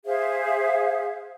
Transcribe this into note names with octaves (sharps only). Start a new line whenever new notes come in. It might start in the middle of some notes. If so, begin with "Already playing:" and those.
G#4 C5 E5 F5